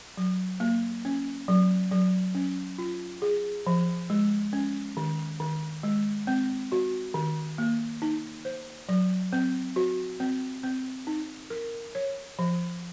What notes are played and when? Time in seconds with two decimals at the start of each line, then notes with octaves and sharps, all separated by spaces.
0.17 F#3
0.60 A#3
1.05 C#4
1.48 F#3
1.92 F#3
2.35 C#4
2.78 F4
3.22 G#4
3.67 F3
4.10 G#3
4.53 C#4
4.97 D#3
5.40 D#3
5.83 G#3
6.27 C4
6.72 F#4
7.14 D#3
7.58 A#3
8.02 D#4
8.45 C5
8.89 F#3
9.33 C4
9.76 F#4
10.20 C4
10.63 C4
11.07 D#4
11.50 A#4
11.95 C#5
12.39 F3